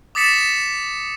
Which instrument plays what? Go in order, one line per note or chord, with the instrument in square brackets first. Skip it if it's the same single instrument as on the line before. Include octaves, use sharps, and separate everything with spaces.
[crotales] D6 D#6 A6 B6 C#7 E7